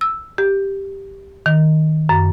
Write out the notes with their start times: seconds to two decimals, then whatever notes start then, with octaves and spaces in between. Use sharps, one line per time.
0.01 E6
0.38 G4
1.46 D#3
2.09 F#2